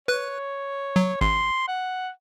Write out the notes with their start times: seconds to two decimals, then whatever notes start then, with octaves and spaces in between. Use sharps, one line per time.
0.08 B4 C#5 F#6
0.96 F#3
1.21 G#1 C6
1.68 F#5